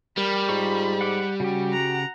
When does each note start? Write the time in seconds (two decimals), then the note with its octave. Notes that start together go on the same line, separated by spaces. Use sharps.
0.18 G3 A#4 B5
0.49 G#2 F4 A#5 C#6
1.01 F#5 D6
1.40 C#3 C#4 F#4 G4
1.73 F#5 A#5